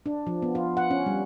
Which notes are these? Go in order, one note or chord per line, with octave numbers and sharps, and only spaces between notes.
D4
F3
B3
F4
F#5
C#4
G3